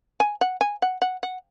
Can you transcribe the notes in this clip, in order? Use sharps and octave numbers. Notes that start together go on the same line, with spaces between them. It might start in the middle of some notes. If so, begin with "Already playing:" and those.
G#5
F#5
G#5
F#5
F#5
F#5